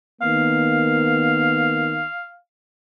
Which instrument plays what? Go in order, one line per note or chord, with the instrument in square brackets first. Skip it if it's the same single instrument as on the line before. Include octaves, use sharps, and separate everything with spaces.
[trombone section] D#3 A#3 B3 [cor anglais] F5